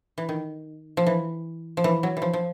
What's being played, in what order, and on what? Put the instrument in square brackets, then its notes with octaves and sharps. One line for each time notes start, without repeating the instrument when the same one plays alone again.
[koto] E3
D#3
F3
E3
F3
E3
F#3
E3
F3
F3